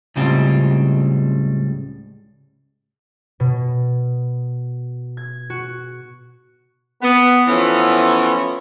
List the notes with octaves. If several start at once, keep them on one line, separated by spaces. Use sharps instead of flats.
C#2 A2 C#3 G3 C4 F4
B2
G#6
F#4
B3
E3 F3 A3 B3 C#4